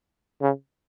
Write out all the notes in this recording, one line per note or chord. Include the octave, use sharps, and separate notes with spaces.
C#3